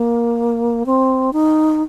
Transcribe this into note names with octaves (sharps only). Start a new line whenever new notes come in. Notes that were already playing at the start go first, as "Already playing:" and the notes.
Already playing: A#3
C4
D#4